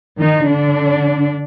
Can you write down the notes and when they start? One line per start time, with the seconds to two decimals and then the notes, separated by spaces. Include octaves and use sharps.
0.18 D#3 D#4
0.47 D3 D4